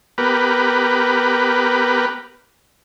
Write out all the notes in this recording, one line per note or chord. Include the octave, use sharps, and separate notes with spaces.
B3 G4 A#4 B4